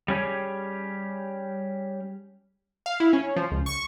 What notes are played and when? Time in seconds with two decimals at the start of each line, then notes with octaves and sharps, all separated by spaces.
0.08 G3 C#4 G4 G#4
2.86 F5
3.00 E4
3.13 C#4
3.36 F3
3.51 C#2
3.66 C#6